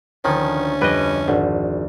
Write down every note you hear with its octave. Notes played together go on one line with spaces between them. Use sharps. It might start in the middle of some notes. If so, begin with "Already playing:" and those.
D2 D#3 F3 C#4
F2 G3 B4 D#5 G5
G#1 D3